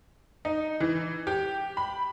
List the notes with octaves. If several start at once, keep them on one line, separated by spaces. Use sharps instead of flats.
D#4
E3
G4
B5